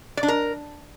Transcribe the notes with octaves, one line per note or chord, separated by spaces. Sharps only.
D5
D4
A#4